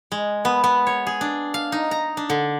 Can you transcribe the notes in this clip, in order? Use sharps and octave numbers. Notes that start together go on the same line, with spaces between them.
G#3
B3
B3
C#5
G#4
D4
F5
D#4
A#5
D4
D3